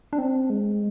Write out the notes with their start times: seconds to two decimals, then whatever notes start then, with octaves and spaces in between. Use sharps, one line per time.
0.13 D4
0.18 C4
0.50 G#3